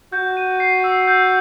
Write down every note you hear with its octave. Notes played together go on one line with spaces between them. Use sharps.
F#4 G6
D#7
C7
E6
G6